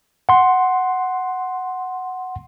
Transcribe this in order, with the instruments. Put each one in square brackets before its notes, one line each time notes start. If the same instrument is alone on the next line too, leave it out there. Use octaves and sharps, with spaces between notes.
[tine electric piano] F#5 C6